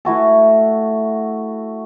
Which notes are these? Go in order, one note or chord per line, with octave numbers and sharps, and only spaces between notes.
A3 E4 F#4 A4